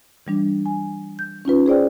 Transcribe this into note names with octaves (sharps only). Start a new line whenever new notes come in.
E3 G3 D4
G#5
G6
C#4 D#4 F4 B4
G#4 C5 D5 G5